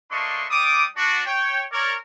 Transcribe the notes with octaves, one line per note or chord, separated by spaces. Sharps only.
A3 A#3 D4 D#5 C6 C#6
G3 D6 D#6
D4 F#4
C#5 G5
A#4 C#5 D5